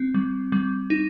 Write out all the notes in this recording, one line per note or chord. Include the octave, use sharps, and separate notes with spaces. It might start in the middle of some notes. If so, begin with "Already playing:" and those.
Already playing: C4
G3
G3
D#4